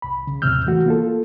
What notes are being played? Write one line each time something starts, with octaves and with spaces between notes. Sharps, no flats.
C2 B5
C#3
D#2 A2 C3 E6 F6 G6
E3 A3 F#4
A#3 F4 A4